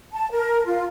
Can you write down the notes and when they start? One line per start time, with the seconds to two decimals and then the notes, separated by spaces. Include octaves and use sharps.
0.13 A5
0.31 A#4
0.65 F4